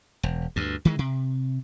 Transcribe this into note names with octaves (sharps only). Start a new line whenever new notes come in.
E1
D2 G2
D#3 E3 G#3
C3